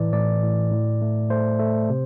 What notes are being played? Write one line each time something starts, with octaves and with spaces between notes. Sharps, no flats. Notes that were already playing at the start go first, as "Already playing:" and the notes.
Already playing: A2 E3 D5
A2 D5
A2
A2
A3
A3 C5
A3
C3